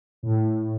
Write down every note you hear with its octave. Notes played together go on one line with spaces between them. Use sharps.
A2